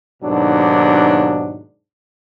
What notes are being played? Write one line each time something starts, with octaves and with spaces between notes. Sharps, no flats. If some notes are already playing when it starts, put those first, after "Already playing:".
D#2 G#2 B2 F#3 D4